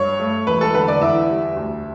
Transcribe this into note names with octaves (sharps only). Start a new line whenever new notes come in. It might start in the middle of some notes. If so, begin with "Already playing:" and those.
Already playing: G2 C#5
A3
E1 B4
A4
D3 B4
D5
E2 E5
G3
D2